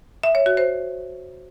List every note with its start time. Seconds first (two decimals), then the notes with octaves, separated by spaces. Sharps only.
0.23 E5
0.35 C#5
0.46 F#4
0.57 C5